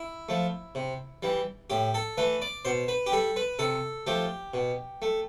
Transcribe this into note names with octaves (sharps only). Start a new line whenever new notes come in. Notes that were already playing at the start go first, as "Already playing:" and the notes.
Already playing: E4
F3 A3
C3
E3 G3
A2 G4
A4
E3 A3 B4
D5
B2 C5
B4
G4
G3 A4
B4
C3 A4
F3 A3 G4
B2
A3